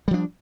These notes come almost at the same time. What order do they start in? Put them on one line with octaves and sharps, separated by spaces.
G3 F3 D4